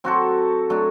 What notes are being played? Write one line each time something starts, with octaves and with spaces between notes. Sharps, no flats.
F#3 C4 F#4 A4
F#3 A3 D4